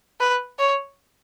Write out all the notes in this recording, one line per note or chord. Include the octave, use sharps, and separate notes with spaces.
B4
C#5